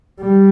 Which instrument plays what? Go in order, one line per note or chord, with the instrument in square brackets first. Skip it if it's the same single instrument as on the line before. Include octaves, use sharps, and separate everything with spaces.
[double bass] G3